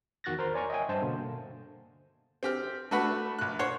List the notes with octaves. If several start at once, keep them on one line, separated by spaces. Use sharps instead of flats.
E2 D#3 F#4 F#6 A6 A#6
A#4 C5 A#5 C6
C#5 D5 G#5 A#5 C#6
D#5 E5 G5 G#5
G2 C5 A5
B2 D3 A#3
C4 G4 F6
A3 D4 F#4 B4 F#5 B5
A#1 F#6
C5 C#5 F#5